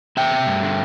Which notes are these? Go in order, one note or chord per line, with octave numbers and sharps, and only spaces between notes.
E2 E5 G5
C3
G2
D3